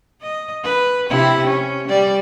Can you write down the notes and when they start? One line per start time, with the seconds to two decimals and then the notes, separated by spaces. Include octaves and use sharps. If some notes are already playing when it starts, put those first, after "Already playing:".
0.22 D#5
0.64 B4
1.10 C3 E4 G4
1.47 C#4
1.88 G3 D5